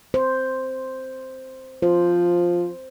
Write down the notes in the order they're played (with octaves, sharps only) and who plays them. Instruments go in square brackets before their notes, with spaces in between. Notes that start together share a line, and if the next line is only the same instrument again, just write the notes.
[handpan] C5
[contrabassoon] F3 [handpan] C5